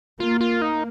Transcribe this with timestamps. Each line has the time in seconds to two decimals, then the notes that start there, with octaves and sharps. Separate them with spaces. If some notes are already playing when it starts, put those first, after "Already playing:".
0.20 A#3 F4
0.41 F4
0.62 D#4